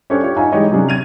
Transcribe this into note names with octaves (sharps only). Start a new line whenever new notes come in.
C#4 D4 G4 A4 C5 C#5
F4 G4 C#5
D#4 E5 F5 G#5 A#5
E3 G#3 D#4 G4 C#5 D#5
C3 F#3 C#4 D4 G#4
G#6 D#7 F7